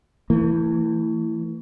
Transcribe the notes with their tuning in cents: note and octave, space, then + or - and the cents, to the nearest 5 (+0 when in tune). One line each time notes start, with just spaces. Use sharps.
E3 +5 A3 +35